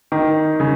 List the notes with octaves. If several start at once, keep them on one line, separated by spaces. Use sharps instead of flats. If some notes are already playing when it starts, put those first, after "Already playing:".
D#3
C#3